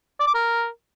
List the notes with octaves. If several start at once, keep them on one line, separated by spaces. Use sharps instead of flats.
D5
D6
A#4